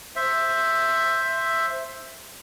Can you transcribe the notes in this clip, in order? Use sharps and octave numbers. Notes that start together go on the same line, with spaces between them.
C5 E5